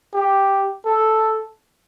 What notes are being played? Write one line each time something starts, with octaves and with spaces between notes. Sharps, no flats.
G4
A4